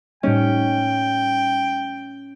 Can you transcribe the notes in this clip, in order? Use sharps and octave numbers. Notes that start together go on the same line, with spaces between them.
A2 G3 C#4 D#4 G5